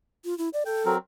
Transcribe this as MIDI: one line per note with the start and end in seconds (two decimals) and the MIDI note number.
0.25 0.36 65
0.38 0.49 64
0.53 0.63 74
0.66 0.93 69
0.66 0.83 79
0.85 0.98 54
0.85 0.98 60
0.85 0.98 70